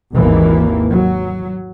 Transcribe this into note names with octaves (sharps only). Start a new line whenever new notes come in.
G#1 D#2 E3 A#3
F#3